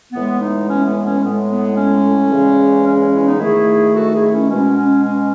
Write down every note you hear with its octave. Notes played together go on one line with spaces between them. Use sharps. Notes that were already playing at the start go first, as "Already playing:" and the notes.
A2 E3 G#3 B3
B3 D#4
C#4
B3
C#4
A2 G#3 B3
B3
C#4
E2 C#3 E3 G#3
C#4
C#4
C#4 E4
B3 D#4
G#2 D#3 A3 E4 G#4
F#4 A4
E4 G#4
C#4 E4
B2 G#3 C#4
C#4
C#4